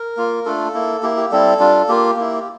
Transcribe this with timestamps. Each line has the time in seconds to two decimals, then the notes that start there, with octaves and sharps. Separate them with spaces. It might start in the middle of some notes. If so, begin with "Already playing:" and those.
Already playing: A#4
0.17 A#3 F4
0.45 A3 D4 F4 A4
0.74 A#3 E4
1.03 A#3 E4 G4
1.17 G4
1.31 G3 C4 E4 A4
1.59 G3 D4 F4
1.88 A#3 F4 G4
2.17 A#3 E4